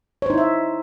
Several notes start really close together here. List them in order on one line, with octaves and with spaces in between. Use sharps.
C#5 C5 D#4 E4 E5